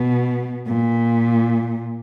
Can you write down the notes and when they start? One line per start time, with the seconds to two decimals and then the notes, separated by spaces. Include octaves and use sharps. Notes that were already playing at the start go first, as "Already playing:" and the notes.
Already playing: B2
0.67 A#2